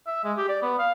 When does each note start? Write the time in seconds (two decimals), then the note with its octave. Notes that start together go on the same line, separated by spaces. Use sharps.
0.07 E5
0.24 G#3
0.37 G4
0.49 D5
0.62 B3
0.79 F5